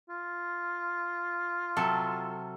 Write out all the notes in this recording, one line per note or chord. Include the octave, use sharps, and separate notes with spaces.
F4
C3 F#3 A4